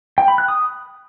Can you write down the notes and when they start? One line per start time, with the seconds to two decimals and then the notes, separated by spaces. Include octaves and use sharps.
0.18 G5
0.28 B5
0.38 F#6
0.48 D#6